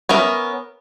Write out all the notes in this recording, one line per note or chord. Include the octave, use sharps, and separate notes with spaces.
B3 C#4 A#4 E5